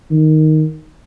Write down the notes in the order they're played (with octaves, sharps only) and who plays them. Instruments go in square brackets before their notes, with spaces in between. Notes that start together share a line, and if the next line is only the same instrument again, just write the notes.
[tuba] D#3